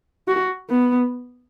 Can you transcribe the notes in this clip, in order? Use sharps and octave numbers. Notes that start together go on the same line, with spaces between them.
F#4
B3